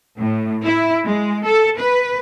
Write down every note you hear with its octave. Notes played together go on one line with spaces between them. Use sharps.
A2
E4
G#3
A4
B4